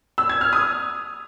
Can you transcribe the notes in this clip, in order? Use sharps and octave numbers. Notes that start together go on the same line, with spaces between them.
E6
G#6
F6
D#6